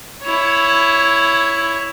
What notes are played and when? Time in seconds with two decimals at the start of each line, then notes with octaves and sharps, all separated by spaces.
0.22 E4 C#5